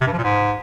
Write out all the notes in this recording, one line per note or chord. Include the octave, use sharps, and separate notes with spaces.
C3
G2
F3
A#2
G#2